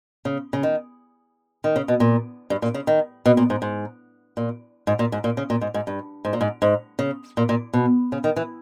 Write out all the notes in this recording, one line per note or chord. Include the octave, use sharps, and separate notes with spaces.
C#3
C#3
D#3
D#3
C#3
B2
A#2
G2
A#2
C#3
D#3
B2
A#2
G#2
G#2
A#2
G#2
A#2
G#2
A#2
C#3
A#2
G#2
G#2
G2
G#2
A#2
G#2
G#2
C#3
A#2
A#2
B2
C#3
D#3
E3